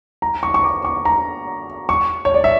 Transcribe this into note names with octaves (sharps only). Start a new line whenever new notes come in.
A#5
C#6
C#6
D6
C#6
A#5
C#6
C#5
D5
E5